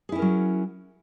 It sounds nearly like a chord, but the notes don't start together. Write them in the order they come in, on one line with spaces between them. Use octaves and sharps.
G#4 E4 C#4 A#4 F#3